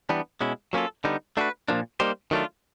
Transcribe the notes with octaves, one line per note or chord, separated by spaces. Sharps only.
E3 G3 B3 D4
B2 G#3 C#4 E4
F#3 A#3 C#4 F4 A4
D3 G3 B3 D#4
A3 D4 F#4 B4
A#2 F3 A#3 D4
G3 A#3 D#4 G4 C5
D#3 F#3 A3 D4 F4